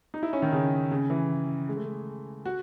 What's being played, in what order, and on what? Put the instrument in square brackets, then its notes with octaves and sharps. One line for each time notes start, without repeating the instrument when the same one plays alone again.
[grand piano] D#4
E4
C#4
D#3
C#3
C#3
E3
G#3
A3
G#3
F#4